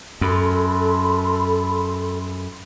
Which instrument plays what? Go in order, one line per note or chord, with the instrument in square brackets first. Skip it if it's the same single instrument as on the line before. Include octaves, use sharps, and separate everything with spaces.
[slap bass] F#2 [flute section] A4 B5 C6